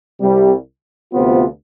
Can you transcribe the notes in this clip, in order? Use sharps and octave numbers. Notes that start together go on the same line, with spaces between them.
C2 C3 G3
D2 C3 F3 B3 F4